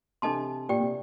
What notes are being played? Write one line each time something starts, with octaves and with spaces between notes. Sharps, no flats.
C3 D4 A4 D#5 A5 C6
A#2 G4 D5 G5
C3